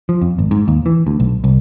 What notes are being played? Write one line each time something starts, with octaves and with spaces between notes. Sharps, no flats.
F3
F2
G#1
G#2
D#2
E3
D2
B1
C2